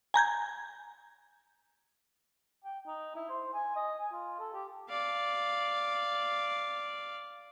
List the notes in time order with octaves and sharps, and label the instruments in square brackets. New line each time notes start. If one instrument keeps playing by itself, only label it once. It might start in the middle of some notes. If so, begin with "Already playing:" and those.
[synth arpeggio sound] G#5 A#5 G6 G#6
[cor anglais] G5
D#4
E4
C5
G#5
D#5
G#5
F4
A4
G4
[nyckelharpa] D5 F5